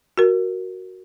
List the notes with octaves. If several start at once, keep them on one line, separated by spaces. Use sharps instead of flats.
F#4 A#4